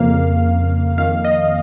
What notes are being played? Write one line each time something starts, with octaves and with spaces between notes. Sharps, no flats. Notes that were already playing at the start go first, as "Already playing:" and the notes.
Already playing: F2 C#3 A#3 F5
F2 D#3 A#3 F5
D#5